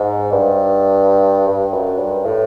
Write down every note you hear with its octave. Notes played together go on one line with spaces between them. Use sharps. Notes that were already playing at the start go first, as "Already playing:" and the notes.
Already playing: G#2
G2
G2
F#2
G2
A2